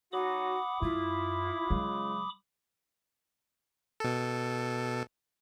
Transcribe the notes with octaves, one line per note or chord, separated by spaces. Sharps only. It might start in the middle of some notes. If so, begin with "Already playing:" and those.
F#3 D#4 F#4 F#5 B5 D6 D#6
F#2 E4 F4
C#3 F#3 G#3
B2 A4